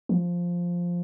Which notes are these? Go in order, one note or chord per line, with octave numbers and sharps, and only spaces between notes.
F3